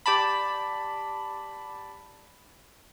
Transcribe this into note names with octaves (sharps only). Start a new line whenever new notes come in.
G4 D5 A5 B5